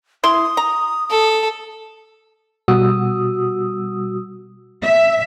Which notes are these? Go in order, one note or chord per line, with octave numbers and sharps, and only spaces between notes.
E4 C6 D#6
A#5
A4
B2 G3 F#4 D#6 E6
E5